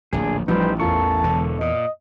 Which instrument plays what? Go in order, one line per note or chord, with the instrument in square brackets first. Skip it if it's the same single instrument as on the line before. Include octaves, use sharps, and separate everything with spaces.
[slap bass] D1 A#1 D#2 [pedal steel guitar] D4 G#4
[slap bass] A1 [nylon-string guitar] F3 G3 [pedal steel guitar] D#4 G4 C5 [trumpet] B4
[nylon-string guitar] E2 F4 A#4 [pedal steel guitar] A4 C#6 [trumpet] A5
[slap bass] E1 D3
[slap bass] A#2 [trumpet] D#5